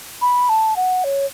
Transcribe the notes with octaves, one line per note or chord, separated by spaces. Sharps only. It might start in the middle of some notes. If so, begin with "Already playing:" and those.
B5
A5
F#5
C#5